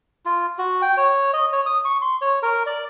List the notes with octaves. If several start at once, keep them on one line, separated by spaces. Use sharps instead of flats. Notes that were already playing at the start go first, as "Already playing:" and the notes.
F4
F#4
G5
C#5
D#5
C#5
D#6
C#6
C6
C#5
A#4
D5